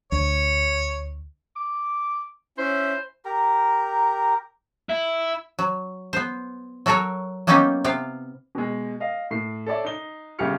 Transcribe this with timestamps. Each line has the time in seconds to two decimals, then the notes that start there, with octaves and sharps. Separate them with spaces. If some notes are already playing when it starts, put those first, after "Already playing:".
0.12 D2 C#5
1.56 D6
2.58 C#4 E4 C5 E5
3.25 G4 A#4 A#5
4.89 E4
5.59 F#3
6.13 B3 C5
6.86 F#3 F#4 A4 A#4 C#5
7.47 F#3 A#3 B3 C#4 D#4 G4
7.84 C3 B3 F5
8.55 B2 G#3
9.00 D#5 F5
9.31 A2 C7
9.66 A4 C#5 D5 E5
9.85 D#4 G7
10.39 G1 C#3 G4 G#4 F6 C#7